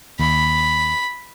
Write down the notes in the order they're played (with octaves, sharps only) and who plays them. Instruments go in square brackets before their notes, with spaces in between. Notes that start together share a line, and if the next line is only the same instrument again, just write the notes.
[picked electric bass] D#2 [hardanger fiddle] B5